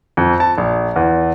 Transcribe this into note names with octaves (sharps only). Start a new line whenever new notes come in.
F2
A5
A#1
E2